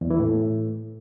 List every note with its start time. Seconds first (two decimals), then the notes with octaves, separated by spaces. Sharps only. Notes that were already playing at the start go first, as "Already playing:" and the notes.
0.01 E2
0.10 E3
0.20 A2